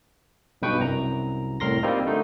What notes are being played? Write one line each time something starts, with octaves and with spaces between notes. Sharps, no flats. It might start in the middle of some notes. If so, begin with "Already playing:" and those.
B1 G2 B2 B4 G5 C#6
C2 F#2 A#5
C2 A2 A#4 C6 A#6
G3 A#3 C4 D#4 F4
D3 A3 D#4